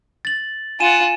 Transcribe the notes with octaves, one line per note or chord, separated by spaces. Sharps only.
A6 F#7
F4 F#5 G#5 D#7 E7